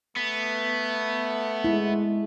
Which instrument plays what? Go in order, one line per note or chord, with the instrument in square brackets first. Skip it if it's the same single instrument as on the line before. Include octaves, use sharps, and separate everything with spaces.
[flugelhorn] A3 [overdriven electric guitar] B3
[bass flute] G#3 [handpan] E4